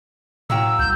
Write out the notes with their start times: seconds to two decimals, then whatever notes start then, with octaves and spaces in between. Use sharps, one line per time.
0.50 A2 F#3 A#3 G5 E6
0.79 C2 G6